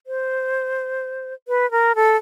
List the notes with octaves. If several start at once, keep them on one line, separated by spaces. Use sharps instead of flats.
C5
B4
A#4
A4